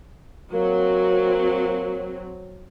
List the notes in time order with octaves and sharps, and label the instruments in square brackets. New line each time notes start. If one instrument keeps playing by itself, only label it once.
[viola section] F#3 C4 [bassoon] A#3